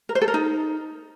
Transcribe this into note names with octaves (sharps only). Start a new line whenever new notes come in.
A#4
C5
A4
A#4
D#4